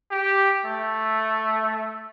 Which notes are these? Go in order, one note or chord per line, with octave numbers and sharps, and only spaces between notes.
G4
A3